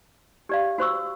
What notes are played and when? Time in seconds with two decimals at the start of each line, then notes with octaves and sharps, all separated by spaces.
0.49 G4 D5 F5
0.78 F#4 C5 C#6 E6